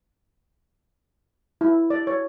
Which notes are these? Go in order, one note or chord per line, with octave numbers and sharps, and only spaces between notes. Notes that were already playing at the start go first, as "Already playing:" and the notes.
E4
D5
C#5